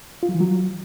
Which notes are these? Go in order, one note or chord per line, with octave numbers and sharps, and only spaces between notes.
F4
F#3
E3
F#3